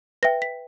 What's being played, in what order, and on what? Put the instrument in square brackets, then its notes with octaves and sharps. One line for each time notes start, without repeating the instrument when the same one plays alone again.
[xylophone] B4 E5 G5 A#6
B6